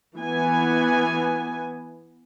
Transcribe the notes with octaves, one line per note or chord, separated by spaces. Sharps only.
E3 B3 G#5